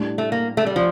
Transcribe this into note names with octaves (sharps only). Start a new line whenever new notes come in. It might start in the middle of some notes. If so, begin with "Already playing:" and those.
Already playing: A2 G3 D4
A3
A#3
A3
G3
F3